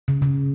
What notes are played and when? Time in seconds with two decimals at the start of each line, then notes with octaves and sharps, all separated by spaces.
0.08 C#3
0.22 C#3